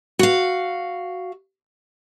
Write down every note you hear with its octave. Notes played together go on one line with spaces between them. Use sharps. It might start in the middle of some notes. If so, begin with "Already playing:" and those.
F#4 F5